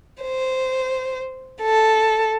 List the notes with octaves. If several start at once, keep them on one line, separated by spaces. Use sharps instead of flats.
C5
A4